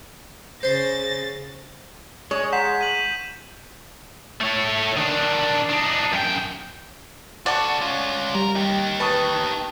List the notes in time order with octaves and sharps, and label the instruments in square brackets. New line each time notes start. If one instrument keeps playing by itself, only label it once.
[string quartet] C#3 A6 A#6 [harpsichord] C5 C6
[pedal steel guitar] G#3 [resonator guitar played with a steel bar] C#5
[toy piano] F#5 A#5 C6 [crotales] G6 B6 E7
[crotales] D#7 F#7
[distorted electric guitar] A3 C#5
D#3 D4
D4 D#4
F#2 G5
[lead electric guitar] F#4 A4 [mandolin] D5 F#5 C#6
[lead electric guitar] C#4 F4
[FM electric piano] G3 [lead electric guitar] A#4
[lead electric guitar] D#4 G4
[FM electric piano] B4 C#6 D#6 [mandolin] A5